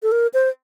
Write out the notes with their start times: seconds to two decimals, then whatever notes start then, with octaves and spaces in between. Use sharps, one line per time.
0.03 A4
0.12 A#4
0.34 C5